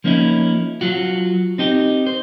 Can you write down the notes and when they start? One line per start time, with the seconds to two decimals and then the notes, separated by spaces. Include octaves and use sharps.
0.04 F3 A#3 C#4 D#4 E4
0.81 F#3 F4 F#4
1.58 C4 D#4 G4
2.06 C5